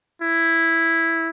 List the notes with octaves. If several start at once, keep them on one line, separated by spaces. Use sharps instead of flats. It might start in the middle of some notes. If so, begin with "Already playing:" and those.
E4